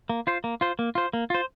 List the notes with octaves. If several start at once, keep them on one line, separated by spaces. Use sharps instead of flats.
A#3
F4 C5
A#3
F4 C5
A#3
F4 C5
A#3
F4 C5